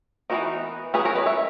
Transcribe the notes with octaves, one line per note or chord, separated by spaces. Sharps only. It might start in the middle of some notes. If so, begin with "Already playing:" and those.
E3 G#3 B3 D#4 F#4 A#4
C#4 G#4 B4
F#3
A#4 C#5
B4 D#5
C#5 E5